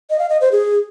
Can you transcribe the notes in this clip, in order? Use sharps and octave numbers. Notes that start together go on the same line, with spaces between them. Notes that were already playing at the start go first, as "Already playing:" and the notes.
D#5
F5
D#5
C5
G#4